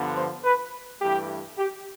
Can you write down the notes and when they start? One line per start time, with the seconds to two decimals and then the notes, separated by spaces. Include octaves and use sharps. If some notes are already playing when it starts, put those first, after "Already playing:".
Already playing: G2 D3 F3 B3
0.16 C5
0.44 B4
1.01 G2 E3 A3 G4
1.58 G4